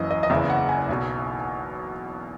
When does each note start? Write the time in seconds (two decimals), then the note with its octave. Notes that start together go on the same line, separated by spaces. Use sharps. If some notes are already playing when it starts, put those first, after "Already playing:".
Already playing: F#1 F#2 E3 D#5
0.11 D#5
0.23 D#5
0.30 F#1 E2 C#3 E3 E5
0.50 F#5
0.69 G#5
0.89 B1 B2